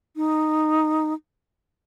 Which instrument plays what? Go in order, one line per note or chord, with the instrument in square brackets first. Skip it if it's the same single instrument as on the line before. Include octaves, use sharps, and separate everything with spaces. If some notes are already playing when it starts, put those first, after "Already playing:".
[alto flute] D#4